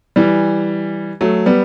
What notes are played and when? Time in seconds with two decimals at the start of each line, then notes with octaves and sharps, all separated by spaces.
0.16 E3 G3
1.21 F#3 A3
1.46 G3 B3